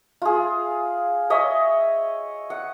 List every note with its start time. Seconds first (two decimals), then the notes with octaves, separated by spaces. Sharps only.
0.22 F4 G#4
1.30 C#5 D#5 E5
2.50 F#5